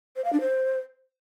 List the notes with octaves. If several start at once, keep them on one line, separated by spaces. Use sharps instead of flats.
C5
F5
D4
C5